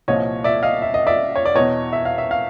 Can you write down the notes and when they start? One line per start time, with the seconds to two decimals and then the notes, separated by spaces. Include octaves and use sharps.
0.08 C2 A#2 F3 C#5 D#5
0.44 D5 E5
0.63 D#5 F5
0.82 E5
0.94 D#5
1.07 D5 E5
1.36 C#5
1.45 D5
1.55 E2 B2 C#5 D#5
1.93 E5
2.05 F5
2.18 E5
2.31 F5